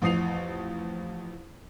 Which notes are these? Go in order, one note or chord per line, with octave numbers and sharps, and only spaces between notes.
A1 F2 D#6 C7 F7